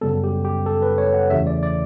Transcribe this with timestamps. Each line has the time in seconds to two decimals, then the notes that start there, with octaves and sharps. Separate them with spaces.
0.01 F#2 C#3 G3 B3 A4
0.24 G4
0.44 G4
0.66 A4
0.82 B4
0.98 C#5
1.14 F#5
1.30 E2 C#3 E3 A3 E5
1.47 D5
1.63 D5